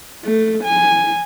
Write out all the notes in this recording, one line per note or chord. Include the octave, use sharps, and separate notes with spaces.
A3
G#5